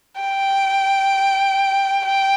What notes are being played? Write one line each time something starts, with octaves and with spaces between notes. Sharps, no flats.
G5
G5